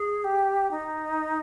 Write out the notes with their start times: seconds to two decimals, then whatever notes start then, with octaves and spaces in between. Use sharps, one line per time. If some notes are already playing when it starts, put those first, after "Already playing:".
Already playing: G#4
0.24 G4
0.71 D#4